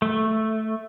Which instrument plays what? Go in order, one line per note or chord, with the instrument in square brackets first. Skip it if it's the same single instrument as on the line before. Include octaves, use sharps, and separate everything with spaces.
[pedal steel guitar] A3